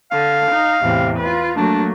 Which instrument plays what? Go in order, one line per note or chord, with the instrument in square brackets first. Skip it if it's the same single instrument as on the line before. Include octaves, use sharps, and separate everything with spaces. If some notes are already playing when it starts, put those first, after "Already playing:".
[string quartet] D3 [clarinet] F5
[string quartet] D#4
E2 A2 C3
F4 B4
[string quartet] F#3 A3 A#3 [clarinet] D4